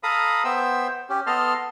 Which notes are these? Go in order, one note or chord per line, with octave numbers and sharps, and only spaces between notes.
A4 F5 A#5 B5 D#6
B3 C5 E5 G5 E6
C#4 G4
B3 A4 D#5 A5 C6 F6